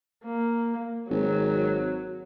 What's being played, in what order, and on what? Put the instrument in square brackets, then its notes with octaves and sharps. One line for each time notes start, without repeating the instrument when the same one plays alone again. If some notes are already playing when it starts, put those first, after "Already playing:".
[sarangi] A#3
[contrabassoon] G#1 [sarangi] F#3